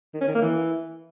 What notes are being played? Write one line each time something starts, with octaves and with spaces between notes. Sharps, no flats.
D#3
C#4
D#3
A#3
E3